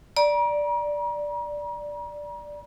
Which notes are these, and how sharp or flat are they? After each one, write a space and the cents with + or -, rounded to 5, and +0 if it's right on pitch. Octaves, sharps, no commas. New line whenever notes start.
D5 +0 A#5 +40